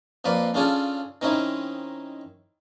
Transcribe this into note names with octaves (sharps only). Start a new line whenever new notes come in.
F2 A#3 B4 D5
C#3 C#4 D4 F4 G#4 A4
D#3 C4 C#4 D#4 E4